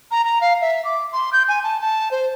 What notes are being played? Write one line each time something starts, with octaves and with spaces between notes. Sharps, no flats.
A#5
A#5
F5
E5
D6
C6
G6
G#5
A5
A5
C5